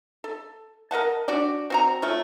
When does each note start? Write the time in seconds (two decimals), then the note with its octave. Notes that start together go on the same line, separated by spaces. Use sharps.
0.24 A4
0.91 A#4 D#5 F#5 A5
1.28 D4 F#4 G4 D5
1.70 C4 F#4 A#5
2.02 A3 F4 C#5